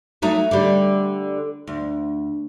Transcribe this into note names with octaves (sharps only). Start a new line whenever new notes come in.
F#3 A3 D#4
D3 G3
D2